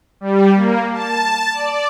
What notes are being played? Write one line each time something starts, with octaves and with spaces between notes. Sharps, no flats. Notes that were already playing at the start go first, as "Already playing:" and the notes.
G3
A#3
A5
D5